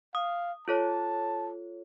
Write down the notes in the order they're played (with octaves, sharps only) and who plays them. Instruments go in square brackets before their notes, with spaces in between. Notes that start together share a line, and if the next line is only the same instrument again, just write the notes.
[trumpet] F5 [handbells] D#6
[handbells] F4 A4 C#5 [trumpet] A5